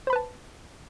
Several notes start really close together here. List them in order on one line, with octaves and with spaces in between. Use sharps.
C5 B5 B4 A5